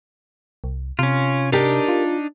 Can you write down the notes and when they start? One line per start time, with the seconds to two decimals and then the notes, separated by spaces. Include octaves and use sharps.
0.64 C2
0.99 C3 C#4 F4
1.52 D4 D#4 G4 A#4
1.88 F4